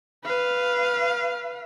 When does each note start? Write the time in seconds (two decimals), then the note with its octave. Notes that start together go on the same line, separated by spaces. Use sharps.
0.24 B4 F5